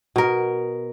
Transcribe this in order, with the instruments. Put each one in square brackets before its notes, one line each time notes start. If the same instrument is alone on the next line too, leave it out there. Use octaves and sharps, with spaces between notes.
[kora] B2 A#4